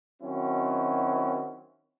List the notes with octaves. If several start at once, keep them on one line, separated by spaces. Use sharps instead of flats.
D#3 F#3 C4 C#4 E4 F#4